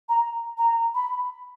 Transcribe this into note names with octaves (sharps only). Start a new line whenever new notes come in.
A#5
A#5
B5